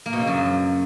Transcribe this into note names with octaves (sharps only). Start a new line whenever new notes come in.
A#3
B2
C#3
F#2